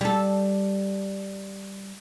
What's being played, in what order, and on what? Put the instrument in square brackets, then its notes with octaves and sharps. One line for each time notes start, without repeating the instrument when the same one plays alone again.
[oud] G3 A4